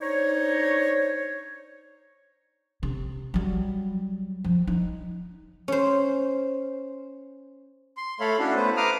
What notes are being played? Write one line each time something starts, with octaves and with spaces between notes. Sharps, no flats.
D4 D#4 C5 C#5
C3
F#3 G3
F3
D#4
C#4 C5
C6
A3 A4 C#5 F5 B5
C#4 D4 E4 F#4 A4
A3 B3 B4 C5
B4 F5 A#5 D6 D#6 F6